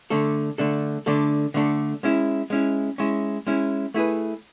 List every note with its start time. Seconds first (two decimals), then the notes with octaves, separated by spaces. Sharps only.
0.10 D3 A3 D4 A4
0.58 D3 A3 D4 A4
1.06 D3 A3 D4 A4
1.54 D3 A3 D4 A4
2.03 G#3 C#4 E4
2.50 G#3 C#4 E4
2.98 G#3 C#4 E4
3.47 G#3 C#4 E4
3.94 A3 E4 G#4 B4